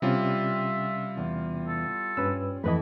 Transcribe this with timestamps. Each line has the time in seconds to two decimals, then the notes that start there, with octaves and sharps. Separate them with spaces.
0.02 C3 G3 C#4 F4 E5
1.17 E2
1.67 A4
2.17 G2 C#4 B4 E6
2.64 F2 E3 A3 B4 D#5 B5